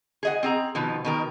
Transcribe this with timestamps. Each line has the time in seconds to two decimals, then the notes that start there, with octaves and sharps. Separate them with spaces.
0.23 G#4 D#5 F#5
0.43 C4 G#4 A#5
0.75 B2 D#3 F3
1.05 B2 D#3 A#4